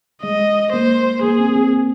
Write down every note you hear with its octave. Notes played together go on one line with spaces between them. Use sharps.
G#3 D#5
A#3 C5
A#3 G#4
C4
C4